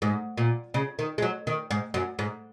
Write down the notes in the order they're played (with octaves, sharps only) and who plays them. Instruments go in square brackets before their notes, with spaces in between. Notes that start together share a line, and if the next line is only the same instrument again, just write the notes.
[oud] G#2
A#2
C#3
D#3
G#3
F#3
D#3
G#2
F#2
G#2